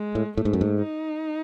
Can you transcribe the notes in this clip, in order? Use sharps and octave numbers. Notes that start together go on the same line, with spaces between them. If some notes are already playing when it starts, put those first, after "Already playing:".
Already playing: G#3
A2
A2 A3
G#2
F#2
G#2
D#4